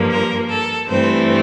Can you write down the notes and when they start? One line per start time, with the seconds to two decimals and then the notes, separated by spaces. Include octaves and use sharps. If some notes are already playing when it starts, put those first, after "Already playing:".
Already playing: G2 F3 A#3
0.11 A#4
0.49 A4
0.88 G2 E3 A3 C4 C5